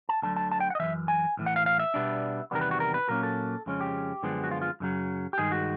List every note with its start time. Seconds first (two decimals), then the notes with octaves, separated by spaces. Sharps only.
0.09 A5
0.22 D2 D3 F#3 A5
0.36 A5
0.52 A5
0.60 G5
0.70 F#5
0.75 D#5
0.80 F#2 C#3 E3 E5
1.08 G#5
1.37 B1 A2 E3
1.46 F#5
1.56 F5
1.66 F5
1.79 E5
1.94 B2 G3 B3 D4
2.51 E2 C3 D#3 G3 B3 A#4
2.61 B4
2.71 F#4
2.80 A#4
2.94 B4
3.09 A#2 F#3 A#3 C#4 A#4
3.23 A4
3.66 F2 C#3 F3 G#3 C#4
3.81 G4
4.23 F#2 D3 F3 G#3 B3
4.44 F#4
4.51 F4
4.62 F4
4.80 F#2 C#3 F#3
5.33 G4
5.38 G2 D#3 G#3 G#4
5.52 F#4